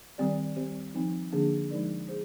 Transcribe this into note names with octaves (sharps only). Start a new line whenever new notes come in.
D#3 G3 C4 G4 D5
G3 C4 G4 C5
F3 C4 D#4
D3 F3 A#3 D4 G#4
F3 G#3 D#4 A#4 D5
G#4 C5